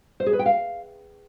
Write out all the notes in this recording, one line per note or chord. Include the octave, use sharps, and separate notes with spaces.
C5
G#4
B4
G5
F5